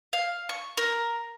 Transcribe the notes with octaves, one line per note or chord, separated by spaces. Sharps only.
F5
C#6
A#4